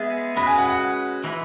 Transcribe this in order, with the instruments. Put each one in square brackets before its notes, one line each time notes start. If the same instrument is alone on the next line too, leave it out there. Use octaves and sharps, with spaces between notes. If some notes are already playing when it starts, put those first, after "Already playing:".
Already playing: [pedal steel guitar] G#3 B3 G#4 [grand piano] E5
[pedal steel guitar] G#3 C#4 F#4 B4 [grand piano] B5
[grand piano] G#5
F#5
F#5
[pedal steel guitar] E3 G#3 E4 B4